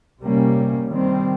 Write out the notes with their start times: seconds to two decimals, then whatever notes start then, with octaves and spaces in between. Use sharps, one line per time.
0.23 C3 G3 A#3 C#4
0.88 D#3 G3 C4